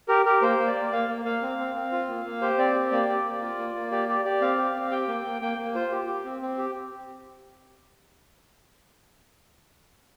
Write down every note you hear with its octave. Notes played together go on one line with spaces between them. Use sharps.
G4 A#4
G4 A#4
A#3 C5
A#3
D5
A#3
A#3 F5
A#3
A#3 F5
C4
C4
C4
F4
A#3
A#3
G4 C5
C4 D5
G4
A#3 D5
G4
A#3
F4
A#3
A#3
G4 D5
G4 D5
G4 D5
C4 F5
G4
C4
G4 G5
A#3
A#3
A#3 G5
A#3
F4 C5
G4
G4
C4
C4
G4